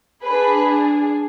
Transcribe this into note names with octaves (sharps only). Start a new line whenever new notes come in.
D4 G#4 B4